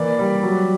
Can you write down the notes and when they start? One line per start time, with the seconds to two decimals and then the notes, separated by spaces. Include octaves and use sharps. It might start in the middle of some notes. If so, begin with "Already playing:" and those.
Already playing: E3 A#3 D5
0.19 G3
0.43 F#3